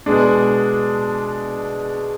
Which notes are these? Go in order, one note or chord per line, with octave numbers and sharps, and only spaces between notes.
B2 G#3 D4